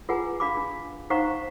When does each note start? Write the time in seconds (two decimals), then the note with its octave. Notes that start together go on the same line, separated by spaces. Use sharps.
0.09 F4 G#4 B4 F#5 G#5 A#5
0.40 D4 F5 B5 D6
0.57 D4
1.10 D#4 C5 F5 F#5 A#5 C#6